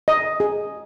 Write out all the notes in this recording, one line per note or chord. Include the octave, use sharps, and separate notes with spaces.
D#5
G#4